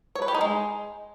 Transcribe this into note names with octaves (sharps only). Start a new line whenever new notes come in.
C#5
B4
G4
D#4
G#3